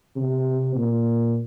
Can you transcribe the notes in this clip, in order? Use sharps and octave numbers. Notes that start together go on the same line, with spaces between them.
C3
A#2